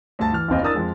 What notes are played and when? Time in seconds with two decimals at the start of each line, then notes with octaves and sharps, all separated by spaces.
0.19 D2 G2 A5 A6
0.33 E3 F6
0.49 F#1 D#2 C4 D#5
0.62 D4 E4 A#4 D#6 E6 A6
0.74 F2 G#3